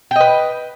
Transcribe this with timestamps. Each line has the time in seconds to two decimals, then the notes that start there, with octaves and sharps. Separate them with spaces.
0.11 G5
0.16 D#5
0.20 B4